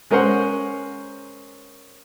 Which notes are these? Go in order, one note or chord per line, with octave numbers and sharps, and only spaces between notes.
G#3 C#4 A#4 C5 F#5